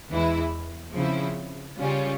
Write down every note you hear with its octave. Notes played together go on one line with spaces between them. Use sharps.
E2 E3 G#3 E4
C#3 F3 C4 E4
C#3 G3 C#4 F4